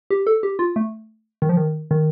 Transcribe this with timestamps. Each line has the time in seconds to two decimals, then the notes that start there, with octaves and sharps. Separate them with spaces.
0.10 G4
0.27 A4
0.43 G4
0.59 F4
0.76 A3
1.42 D#3
1.49 F3
1.57 D#3
1.91 D#3